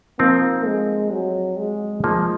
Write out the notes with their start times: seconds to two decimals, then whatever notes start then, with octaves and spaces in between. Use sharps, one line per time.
0.19 F3 A#3 C4 D#4
0.65 G#3
1.12 F#3
1.57 G#3
2.04 F3 G#3 A#3 D#4